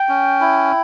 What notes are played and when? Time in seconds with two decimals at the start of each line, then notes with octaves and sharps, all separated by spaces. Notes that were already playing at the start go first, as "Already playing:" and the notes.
Already playing: G5
0.09 C#4
0.41 E4